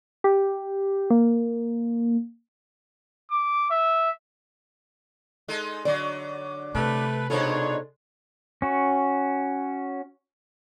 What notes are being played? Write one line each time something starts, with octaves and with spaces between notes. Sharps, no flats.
G4
A#3
D6
E5
G#3 D#4 A4
D3 F#3 D5
C3 A3 B4
B2 G#3 D4 D#4 F4 A4 C5 C#5
C#4 F#4